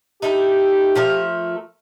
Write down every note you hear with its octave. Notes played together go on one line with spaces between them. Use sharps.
D#4 E4 G4 A4
F3 A3 A#4